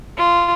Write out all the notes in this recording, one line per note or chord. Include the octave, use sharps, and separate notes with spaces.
F4